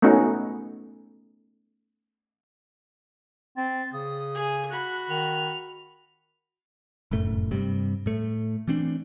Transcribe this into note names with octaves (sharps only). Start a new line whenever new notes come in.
A3 B3 C#4 D#4 F#4
C4 A6
C#3 D#6
G#4
F#4 B5 F#6
D#3 F7
F1 F#2 A2 A3
G2 C3 G3
A2 A3
E3 A3 C4 D4